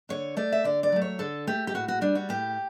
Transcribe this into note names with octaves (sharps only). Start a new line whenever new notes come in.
D3 C#5
A3 D5
E5
D3 D5
D5
F#3 A3
C#5
D3 A4
A3 G4
G4
A2 F#4
F#4
G3 D4
F#4
A2 G4